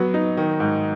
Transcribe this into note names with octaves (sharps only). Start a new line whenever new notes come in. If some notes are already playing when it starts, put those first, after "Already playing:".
Already playing: F#3 B3
D#4
D#3
G#2